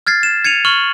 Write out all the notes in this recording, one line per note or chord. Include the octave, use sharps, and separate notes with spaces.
F6 G#6 A6 C7
E7
G#6 C#7 D#7 F7
C#6 F6 F#7